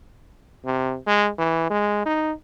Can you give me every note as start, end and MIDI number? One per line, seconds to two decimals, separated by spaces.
0.65 0.97 48
1.07 1.29 56
1.38 1.68 52
1.70 2.03 56
2.06 2.32 63